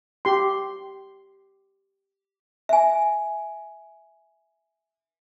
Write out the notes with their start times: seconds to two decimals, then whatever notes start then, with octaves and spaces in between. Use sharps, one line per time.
0.25 G4 C6
2.69 E5 G#5